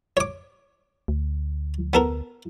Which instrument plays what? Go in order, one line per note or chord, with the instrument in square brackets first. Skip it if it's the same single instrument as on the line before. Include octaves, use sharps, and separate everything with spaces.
[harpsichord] C#5 D6
[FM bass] D2
[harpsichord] B3 A4 A#4